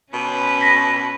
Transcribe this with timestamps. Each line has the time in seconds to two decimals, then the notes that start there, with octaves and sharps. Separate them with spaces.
0.13 B2 C#4 B4
0.61 A#6 B6